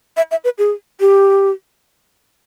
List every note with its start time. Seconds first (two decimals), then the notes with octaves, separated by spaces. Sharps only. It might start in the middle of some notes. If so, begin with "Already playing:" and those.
0.17 E5
0.31 E5
0.44 B4
0.58 G#4
1.00 G4